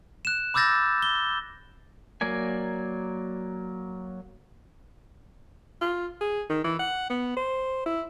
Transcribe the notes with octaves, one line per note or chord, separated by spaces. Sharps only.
F#6 E7
B5 D6 E6 G6 A6 A#6
G7
F#3 A#3 A#4 D5 G#5
F4
G#4
D#3
E3
F#5
B3
C5
E4